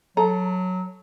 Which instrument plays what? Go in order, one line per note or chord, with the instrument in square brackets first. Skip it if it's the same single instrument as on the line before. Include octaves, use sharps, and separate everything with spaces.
[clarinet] F#3 [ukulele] A4 [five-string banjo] A#5